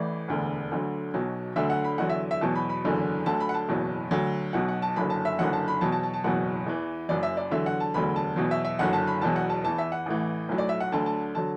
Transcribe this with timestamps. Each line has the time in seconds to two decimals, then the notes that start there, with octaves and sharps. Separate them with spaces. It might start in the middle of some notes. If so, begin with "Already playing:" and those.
Already playing: A1 A2 E3 D5
0.28 E1 D2 D3
0.71 D2 D3 F#3
1.14 B1 B2 F#3
1.56 D2 D3 F#3 E5
1.70 F#5
1.85 B5
1.98 E2 D3 F#3 F#5
2.10 E5
2.31 E5
2.41 E2 B2 F#3 A5
2.56 B5
2.69 B5
2.84 F#1 E2 D3 F#3
3.26 D2 D3 F#3 A5
3.40 B5
3.49 F#5
3.54 A5
3.68 F#1 E2 B2 F#3
4.11 D2 D3 F#3
4.53 B1 B2 F#3 F#5
4.69 F#5
4.82 A5
4.96 F#1 F#2 D3 F#3 B5
5.10 A5
5.25 E5
5.39 F#1 F#2 D3 F#3 F#5
5.53 A5
5.68 B5
5.81 E2 B2 F#3 A5
5.92 A5
6.03 A5
6.13 A5
6.24 F#1 E2 B2 F#3 F#5
6.66 E2 E3
7.09 F#1 F#2 F#3 D5
7.23 E5
7.37 D5
7.51 E2 D3 F#3 E5
7.66 F#5
7.80 A5
7.94 E1 D2 D3 F#3 B5
8.16 A5
8.36 E2 B2 F#3
8.51 E5
8.65 E5
8.79 F#1 F#2 D3 F#3 F#5
8.93 A5
9.07 B5
9.22 E1 E2 B2 F#3 A5
9.36 F#5
9.50 A5
9.64 E2 E3 A5
9.78 E5
9.92 F#5
10.06 A1 A2 E3
10.49 B1 A2 F#3
10.58 D5
10.69 E5
10.80 F#5
10.92 D2 D3 F#3 A5
11.06 A5
11.35 D3 F#3 A5